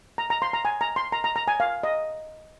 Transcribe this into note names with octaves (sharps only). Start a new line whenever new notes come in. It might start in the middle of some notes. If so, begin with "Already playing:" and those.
A#5
A#5
C6
A#5
G#5
A#5
C6
A#5
A#5
A#5
G#5
F5
D#5